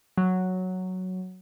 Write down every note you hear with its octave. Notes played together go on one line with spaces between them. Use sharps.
F#3